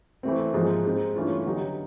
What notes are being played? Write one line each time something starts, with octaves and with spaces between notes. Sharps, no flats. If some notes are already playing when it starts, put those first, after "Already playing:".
E3 A3 C4
G#2 F3 A#3 D#4 G#4
G#3 C4 D#4
G2 E3 A3 C#4 F4
D3 F#3 B3 D#4 G4